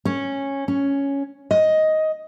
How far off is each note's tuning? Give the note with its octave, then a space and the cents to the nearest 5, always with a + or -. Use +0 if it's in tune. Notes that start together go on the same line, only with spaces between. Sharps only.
C#4 -10
C#4 +5
D#5 +10